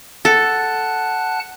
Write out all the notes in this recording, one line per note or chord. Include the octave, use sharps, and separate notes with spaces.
A4 F#5 A5 F#6